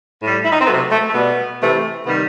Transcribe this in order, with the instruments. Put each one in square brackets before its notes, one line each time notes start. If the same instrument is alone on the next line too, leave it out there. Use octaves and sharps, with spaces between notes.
[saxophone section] A2
G3
E4
D#4
C4
C3 F#3 A3 B3
A3
A3
B2 G3 B3
C3 E3 A3
C3 D#3 G3 B3